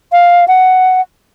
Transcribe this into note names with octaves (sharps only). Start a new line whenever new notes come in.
F5
F#5